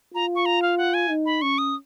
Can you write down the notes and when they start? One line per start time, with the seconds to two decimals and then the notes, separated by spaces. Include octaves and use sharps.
0.14 F4 A#5
0.35 C#6
0.46 A#5
0.62 F5
0.78 F#5
0.94 G#5
1.10 D#4
1.26 B5
1.42 C#4 C#6
1.58 D#6